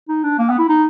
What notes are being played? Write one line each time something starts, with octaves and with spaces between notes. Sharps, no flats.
D#4
D4
A#3
B3
E4
D#4